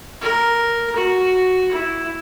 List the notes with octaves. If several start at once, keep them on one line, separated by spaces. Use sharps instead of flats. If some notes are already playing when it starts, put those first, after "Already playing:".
A#4
F#4
E4